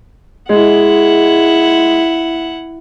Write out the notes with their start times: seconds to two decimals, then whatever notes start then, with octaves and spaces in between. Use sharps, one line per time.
0.49 G#3 E4 F#5